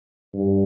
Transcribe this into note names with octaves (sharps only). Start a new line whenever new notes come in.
G2